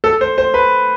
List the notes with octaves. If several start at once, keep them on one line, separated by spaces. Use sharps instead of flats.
A4
C5
C5
B4